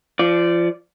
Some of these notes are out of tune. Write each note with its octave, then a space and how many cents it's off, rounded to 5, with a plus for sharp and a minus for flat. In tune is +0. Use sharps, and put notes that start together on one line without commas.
F3 -25 D5 +0